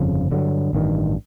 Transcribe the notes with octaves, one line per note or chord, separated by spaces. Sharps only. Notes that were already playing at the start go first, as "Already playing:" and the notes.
Already playing: G1 F2 C#3 F3
G2 D3 F#3
A1 G2 D#3